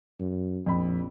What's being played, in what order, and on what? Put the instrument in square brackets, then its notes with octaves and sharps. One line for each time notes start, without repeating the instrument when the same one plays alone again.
[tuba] F#2
[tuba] A#1 [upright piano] F2 B5